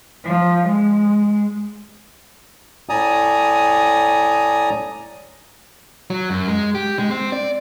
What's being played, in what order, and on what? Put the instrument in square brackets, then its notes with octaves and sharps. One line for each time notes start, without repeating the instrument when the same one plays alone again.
[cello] F3
G#3
[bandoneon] A2 D5 G#5 A#5 D#6
[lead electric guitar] F#3
F#2
G#3
G4
G#3
C4
D5